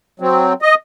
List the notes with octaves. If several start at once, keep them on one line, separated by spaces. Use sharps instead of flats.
F#3 C4
D#5